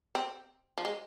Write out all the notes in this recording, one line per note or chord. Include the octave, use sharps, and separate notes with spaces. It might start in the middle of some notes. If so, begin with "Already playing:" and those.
C4
F3
G#3